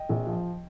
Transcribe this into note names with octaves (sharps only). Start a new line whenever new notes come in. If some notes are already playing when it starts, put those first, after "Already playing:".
Already playing: D#5 G5
A#1
F3